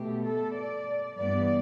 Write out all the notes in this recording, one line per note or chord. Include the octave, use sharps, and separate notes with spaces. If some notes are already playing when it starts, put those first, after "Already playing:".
Already playing: B2 A3 G4
A4
D5
G2 E3 G3 B3 D5